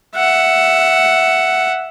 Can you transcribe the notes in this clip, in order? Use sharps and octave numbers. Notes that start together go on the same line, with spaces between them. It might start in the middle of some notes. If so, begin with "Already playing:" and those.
E5 F#5